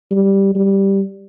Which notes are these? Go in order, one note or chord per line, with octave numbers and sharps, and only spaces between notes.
G3
G3